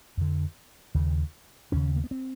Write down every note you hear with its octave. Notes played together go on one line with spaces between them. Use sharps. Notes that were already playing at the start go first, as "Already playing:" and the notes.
F2 D3
D#2 C#3
D#2 C#3 C#4
A#3
B3
C4